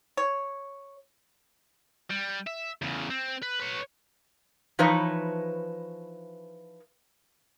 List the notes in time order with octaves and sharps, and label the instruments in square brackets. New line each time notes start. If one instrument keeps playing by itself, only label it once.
[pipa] C#5
[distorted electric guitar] G3
E5
E2 C#3
C4
B4
B4 C#5
[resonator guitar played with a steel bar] E3 F3 D#4 B4 C#5 A5